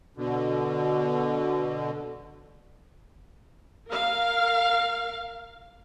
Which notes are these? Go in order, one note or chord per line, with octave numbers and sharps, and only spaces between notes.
B2 D3
A#4 F5